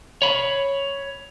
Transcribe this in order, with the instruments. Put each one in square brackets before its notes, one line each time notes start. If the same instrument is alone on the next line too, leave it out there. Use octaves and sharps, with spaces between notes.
[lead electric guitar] C#5 B5